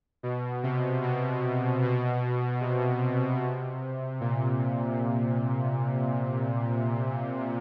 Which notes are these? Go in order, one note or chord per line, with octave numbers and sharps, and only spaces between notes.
B2
C3
B2
B2
C3
A#2